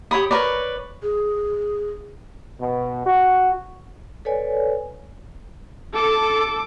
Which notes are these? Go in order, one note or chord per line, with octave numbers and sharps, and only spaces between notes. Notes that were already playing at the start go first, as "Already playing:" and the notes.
G4 C#5 B5 D#6
A#4 B4 C#5 D5
G#4
B2
F#4
A4 B4 C#5 D5 G#5
A4 D6